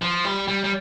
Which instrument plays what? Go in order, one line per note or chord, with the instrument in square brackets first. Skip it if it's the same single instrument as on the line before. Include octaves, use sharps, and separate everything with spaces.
[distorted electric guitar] F3
G3
G3
G3